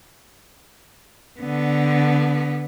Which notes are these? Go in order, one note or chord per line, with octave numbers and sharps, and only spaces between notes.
D3 B3